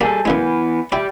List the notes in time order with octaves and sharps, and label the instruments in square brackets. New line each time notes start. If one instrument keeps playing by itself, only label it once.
[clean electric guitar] G3 G#4 A4 [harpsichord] A#3
[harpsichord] F#2 C#3 G#3 [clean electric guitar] E3 B3
[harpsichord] E4 [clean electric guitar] G4 D5